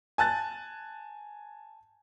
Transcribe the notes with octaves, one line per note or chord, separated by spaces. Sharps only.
G#5 A5 F#6 A6